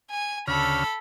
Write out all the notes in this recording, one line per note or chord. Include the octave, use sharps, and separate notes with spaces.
G#5
D2 C#3 A4 B5 F6